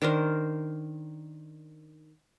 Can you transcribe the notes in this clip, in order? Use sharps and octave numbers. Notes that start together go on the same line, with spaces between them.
D#3 D4 A#4 C5